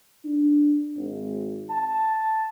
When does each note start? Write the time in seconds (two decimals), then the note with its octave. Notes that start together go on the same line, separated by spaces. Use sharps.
0.25 D4
0.97 G#1
1.70 A5